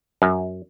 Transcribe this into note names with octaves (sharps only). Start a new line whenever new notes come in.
F#2